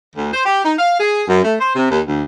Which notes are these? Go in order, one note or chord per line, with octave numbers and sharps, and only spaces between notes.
D2
C5
G4
D#4
F5
G#4
F#2
A3
C5
C3
D#2
D2